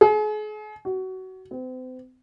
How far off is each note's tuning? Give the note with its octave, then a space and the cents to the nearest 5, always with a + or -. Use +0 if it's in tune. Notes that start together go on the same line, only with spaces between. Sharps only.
G#4 +40
F#4 +20
C4 -40